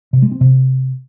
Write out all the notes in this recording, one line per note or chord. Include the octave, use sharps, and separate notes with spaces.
C3
G#3
C4
C3